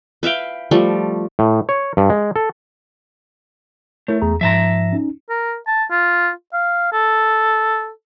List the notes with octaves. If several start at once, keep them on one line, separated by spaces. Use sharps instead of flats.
B4 E5 F5 G5
F3 G3 A3
A2
C#5
G2
G#3
A4
A3 E4 A#4 C#5
E2 G#4 A#5
G#2 F3 E5 A5 A#5
C#4 D#4
A#4
A5
F4
F5
A4